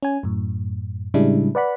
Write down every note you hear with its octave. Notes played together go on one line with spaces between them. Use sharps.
C#4 G#5
F#2 A2
A2 C#3 G3 G#3 D4 E4
B4 D5 F#5 B5